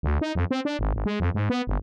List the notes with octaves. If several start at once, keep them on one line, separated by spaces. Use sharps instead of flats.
D2
D#4
F2
C4
D4
G#1
G#1
G#3
F2
G#2
B3
G1